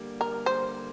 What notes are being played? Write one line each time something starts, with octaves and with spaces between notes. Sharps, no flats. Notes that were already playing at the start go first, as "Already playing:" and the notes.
Already playing: D3 G3 A#3
A#4
C5